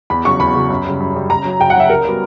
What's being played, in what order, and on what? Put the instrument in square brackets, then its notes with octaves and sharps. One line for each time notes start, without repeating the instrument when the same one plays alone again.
[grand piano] E2 [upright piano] B5
[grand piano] C#3 F#3 [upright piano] C#6
[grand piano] E2 [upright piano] B5
[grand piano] C#3 F#3
F#2
C#3 G3
F#2
C#3 G3
[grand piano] C#3 [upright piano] A#5
[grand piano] F#3 C#4
[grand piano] C#3 [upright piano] G5
[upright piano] F#5
[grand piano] F#3 C#4 [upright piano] E5
[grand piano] C#3 [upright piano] A#4
[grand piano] G3 B3 F#4